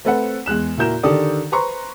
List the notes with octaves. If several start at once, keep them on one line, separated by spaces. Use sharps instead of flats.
A3 C4 A4 B4 C5 F#5
E2 G#3 F#6 E7
A#2 E4 F#4 A#4 G6 E7
D3 D#3 G4 A4 D5 D#6
B4 C5 A#5 C6 C#6